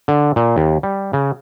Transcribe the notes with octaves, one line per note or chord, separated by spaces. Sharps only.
D3
A#2
D#2
G3
C#3